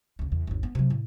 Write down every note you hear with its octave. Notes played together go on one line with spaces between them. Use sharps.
D2 C#3
E2
G1 D#2
B3
C3 F#3
A2